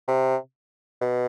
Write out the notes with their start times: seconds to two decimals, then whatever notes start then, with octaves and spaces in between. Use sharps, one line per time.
0.08 C3
1.01 B2